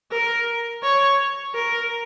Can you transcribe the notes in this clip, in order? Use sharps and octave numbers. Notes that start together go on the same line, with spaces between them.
A#4
C#5
A#4